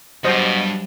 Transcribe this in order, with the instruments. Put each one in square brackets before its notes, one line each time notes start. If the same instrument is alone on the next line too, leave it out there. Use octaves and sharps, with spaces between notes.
[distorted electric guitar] G2 [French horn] B2 [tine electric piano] F#3 G3 [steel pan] C5 D#5